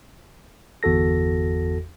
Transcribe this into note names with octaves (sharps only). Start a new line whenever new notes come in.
G1 E2 F#4 A4 A#6